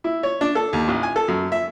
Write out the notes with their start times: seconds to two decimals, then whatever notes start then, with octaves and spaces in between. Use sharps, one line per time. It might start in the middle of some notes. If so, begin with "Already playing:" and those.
0.04 E4
0.23 C#5
0.41 D4
0.55 A4
0.73 D#2
0.88 A1
1.03 G#5
1.16 A4
1.28 F#2
1.52 E5